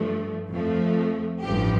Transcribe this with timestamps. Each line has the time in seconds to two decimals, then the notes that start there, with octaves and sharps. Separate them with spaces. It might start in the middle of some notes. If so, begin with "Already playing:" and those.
Already playing: G2 F3 A3
0.50 F2 F3 A3
1.41 A1 G2 F3 G4